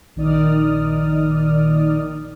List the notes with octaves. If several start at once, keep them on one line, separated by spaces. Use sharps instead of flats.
A#1 D#3 D#4 D5 D#6 F6